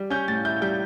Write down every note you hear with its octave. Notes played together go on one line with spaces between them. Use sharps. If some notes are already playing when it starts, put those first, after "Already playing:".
Already playing: G3
C#4 G6
A2 A6
E4 G6
G3 G6